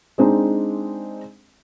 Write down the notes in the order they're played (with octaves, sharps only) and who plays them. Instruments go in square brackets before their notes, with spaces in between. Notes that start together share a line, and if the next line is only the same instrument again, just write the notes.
[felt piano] G#3 C4 D4 D#4